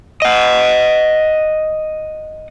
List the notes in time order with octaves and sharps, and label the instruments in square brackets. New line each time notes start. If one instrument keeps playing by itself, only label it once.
[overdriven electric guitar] D#5 F#5